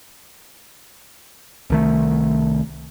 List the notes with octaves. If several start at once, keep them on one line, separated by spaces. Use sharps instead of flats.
C2 D#3 A3